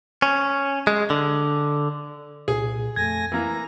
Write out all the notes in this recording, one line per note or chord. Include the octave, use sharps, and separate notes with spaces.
C#4
G#3
D3
C2 A#2 G#4
F2 A3 G#5 G#6 A#6
E3 A#3 A#5